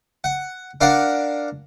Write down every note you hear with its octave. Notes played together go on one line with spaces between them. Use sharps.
F#5
D4 A#4 D5 F5 F#5